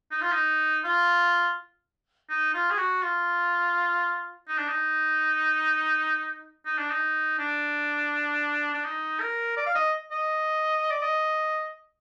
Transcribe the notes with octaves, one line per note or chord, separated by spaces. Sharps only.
D#4
F4
D#4
F4
D#4
F4
G#4
F#4
F4
D#4
D4
D#4
D#4
D4
D#4
D4
D4
D#4
A#4
D5
F5
D#5
D#5
D5
D#5